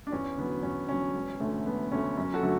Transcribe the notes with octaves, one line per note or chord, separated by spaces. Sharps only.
D4
E2 C#4
D3 F#3 B3
E2 C#4
D3 F#3 C#4
E1
D2 D3 A3
E1 B3
D2 D3 A3 C#4
F#2 C#4
F#4 A4
D3 F#3 A3